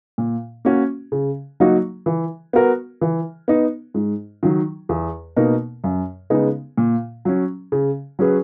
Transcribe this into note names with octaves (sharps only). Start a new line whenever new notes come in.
A#2
A#3 C#4 F#4
C#3
F#3 A#3 D#4 F#4
E3
B3 F#4 A#4
E3
B3 D#4
G#2
D#3 F#3
E2
B2 A#3 D#4 A#4
F#2
C#3 G#3 B3 D#4
A#2
F#3 C#4
C#3
F#3 C#4 G#4 B4